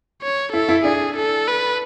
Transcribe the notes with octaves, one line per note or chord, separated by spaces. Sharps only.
C#5
E4 A4
E4
D4 G#4
A4
B4